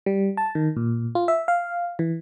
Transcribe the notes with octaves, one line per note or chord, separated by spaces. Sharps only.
G3
A5
D#3
A#2
F4
E5
F5
E3